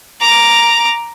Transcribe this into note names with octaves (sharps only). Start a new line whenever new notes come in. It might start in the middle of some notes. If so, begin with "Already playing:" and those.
A#5 D6